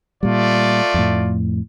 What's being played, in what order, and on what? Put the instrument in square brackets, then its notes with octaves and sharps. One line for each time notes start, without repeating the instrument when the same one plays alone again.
[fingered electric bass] A#2 G3 [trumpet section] A3 F4 D5
[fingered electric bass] F2 A2